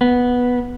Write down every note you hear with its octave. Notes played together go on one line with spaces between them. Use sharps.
B3